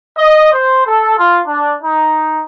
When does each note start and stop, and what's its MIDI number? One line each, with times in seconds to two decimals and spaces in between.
0.17 0.50 75
0.52 0.83 72
0.85 1.17 69
1.18 1.40 65
1.47 1.75 62
1.82 2.42 63